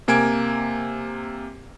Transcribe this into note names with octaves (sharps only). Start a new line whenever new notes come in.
C3 A#3 G#5 G#6 D7